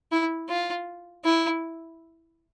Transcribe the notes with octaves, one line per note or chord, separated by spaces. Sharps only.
E4
F4
E4